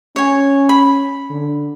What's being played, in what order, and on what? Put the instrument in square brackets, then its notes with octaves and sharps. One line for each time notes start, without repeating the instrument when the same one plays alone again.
[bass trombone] C#4 [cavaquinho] C#5 G#5
[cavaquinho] B5
[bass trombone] D3